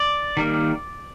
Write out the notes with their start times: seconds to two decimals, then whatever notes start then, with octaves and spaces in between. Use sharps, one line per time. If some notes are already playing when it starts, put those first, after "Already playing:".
Already playing: D5
0.37 D#3 G3 A#3